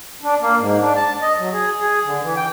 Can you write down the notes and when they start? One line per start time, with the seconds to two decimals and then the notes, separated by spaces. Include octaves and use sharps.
0.23 D4
0.41 A#3
0.58 G#2
0.81 D4
0.96 A5
1.22 D#5
1.38 F#3
1.52 G#4
1.80 G#4
2.04 D3
2.23 E3
2.36 G5